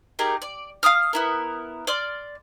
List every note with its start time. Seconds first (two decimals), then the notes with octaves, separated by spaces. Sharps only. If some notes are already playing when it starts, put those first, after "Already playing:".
0.19 D#4 G4 G#4 A#4
0.42 D5
0.83 F5 A#5 D#6 F6
1.13 B3 E4 A#4
1.87 D5 C6 F6